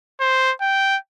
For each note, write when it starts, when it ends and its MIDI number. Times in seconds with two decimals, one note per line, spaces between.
0.20 0.52 72
0.61 0.97 79